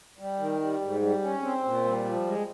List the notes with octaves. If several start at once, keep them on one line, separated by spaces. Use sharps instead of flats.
G3
D#3
G3
G#2
G3
C#4
C4
A#2
G3
F3
G#3